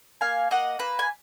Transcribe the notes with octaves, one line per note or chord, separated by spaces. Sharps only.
A#3 F5 G#5
A#3 D#5 F#5
A#3 B4
G#5